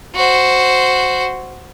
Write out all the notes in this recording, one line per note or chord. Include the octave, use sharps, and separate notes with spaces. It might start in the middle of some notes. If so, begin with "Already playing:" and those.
F#4 C5